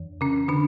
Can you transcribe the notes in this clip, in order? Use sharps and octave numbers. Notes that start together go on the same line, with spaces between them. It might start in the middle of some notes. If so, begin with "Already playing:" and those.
Already playing: F2 E3
C#3 C#4
D3 D4